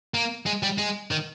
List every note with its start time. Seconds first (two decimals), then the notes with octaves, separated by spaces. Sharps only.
0.14 A#3
0.46 G#3
0.63 G3
0.78 G#3
1.11 D#3